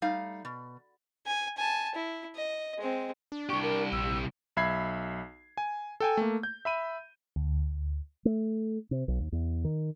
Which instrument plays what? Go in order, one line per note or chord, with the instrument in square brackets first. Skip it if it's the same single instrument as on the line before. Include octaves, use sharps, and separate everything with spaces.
[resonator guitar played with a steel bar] G3 A3 D#4 F5
B2
[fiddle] G#5
G#5 A5
E4
D#5
G#3 C4
[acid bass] D4
[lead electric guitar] C2 G4 [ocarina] C#6
[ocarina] A#4
[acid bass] A#1 [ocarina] E6
[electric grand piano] B1 E5 B5 G#6 C7
G#5
A4 G5 G#5
A3 A#3
G6
E5 B5 D#7
[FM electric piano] D2
[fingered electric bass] A3
C3
B1
D#2
E2
D#3